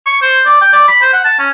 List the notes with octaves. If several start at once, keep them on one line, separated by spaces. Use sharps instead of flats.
C#6
C5
D5
G5
D5
B5
C5
F#5
A5
C#4